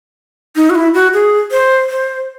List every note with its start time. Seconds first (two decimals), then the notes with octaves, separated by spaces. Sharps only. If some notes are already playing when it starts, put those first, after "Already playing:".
0.56 D#4
0.70 F#4
0.75 E4
0.94 F#4
1.13 G#4
1.51 C5
1.89 C5